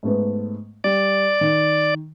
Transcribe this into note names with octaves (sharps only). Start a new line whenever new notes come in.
G#2 A3 B3
G3 D5
D#3